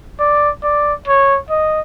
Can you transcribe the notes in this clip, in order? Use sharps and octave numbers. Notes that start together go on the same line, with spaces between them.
D5
D5
C#5
D#5